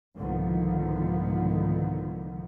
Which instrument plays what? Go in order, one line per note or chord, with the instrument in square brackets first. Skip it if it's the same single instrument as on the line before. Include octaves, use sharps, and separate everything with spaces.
[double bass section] C2 G#2 D3 D#3 F3 B3